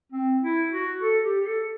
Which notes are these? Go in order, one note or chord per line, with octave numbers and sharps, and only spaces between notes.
C4
E4
F#4
A4
G4
G4
A4